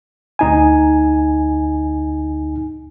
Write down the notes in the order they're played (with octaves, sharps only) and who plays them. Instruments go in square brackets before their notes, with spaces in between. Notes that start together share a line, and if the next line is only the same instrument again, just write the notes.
[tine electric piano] D2 D#4 G#5